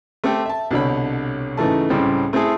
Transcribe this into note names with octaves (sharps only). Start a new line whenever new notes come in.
A3 C4 G4 A4 G5
E5 A5
C2 B2 D3 C#5 B5
G#2 C#3 E3 A3 A5
C#2 A2 C#3 G3 C4
A3 C4 E4 G#4 A4